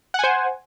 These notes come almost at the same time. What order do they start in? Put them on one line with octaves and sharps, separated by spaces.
F#5 G#5 C5